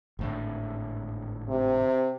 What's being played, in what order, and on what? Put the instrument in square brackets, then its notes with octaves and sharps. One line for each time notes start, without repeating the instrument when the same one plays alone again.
[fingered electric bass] G#1 A2 D3
[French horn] C3